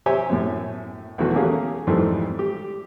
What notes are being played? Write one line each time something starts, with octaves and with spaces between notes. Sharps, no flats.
G4 C5 C#5 E5 G#5
F#2 A2
B1 E2 E3 A3 F#4 B4
A3 A#3 C#4 G4 G#4 F5
F2 G#2 E3 G3 A3 C4
G4